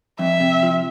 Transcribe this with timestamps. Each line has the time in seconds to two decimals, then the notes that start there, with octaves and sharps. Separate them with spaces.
0.19 F2 E5
0.40 C3
0.63 F3